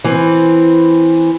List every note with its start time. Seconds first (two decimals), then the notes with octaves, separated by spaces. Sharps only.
0.04 E3 C4